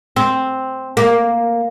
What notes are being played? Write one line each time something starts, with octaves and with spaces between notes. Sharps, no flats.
C4
A#3